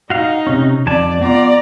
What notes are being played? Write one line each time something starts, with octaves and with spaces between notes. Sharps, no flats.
D#4 F#4 F5
C3 C#4
F2 D5 G#5 A5
B3 F4 D5 A#5